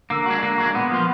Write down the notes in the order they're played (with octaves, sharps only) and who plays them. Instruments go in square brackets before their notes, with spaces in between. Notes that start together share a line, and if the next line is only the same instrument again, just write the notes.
[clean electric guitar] D3 [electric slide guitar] A#3
[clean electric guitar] G#3 D4 F#4
[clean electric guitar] D3 [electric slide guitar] A#3
[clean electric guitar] G#3 D4 F#4
[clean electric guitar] A#2 [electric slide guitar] B3
[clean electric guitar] F3 A#3 F4